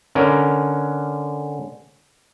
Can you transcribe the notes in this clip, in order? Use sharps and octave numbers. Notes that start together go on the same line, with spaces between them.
D3 C#4 A#4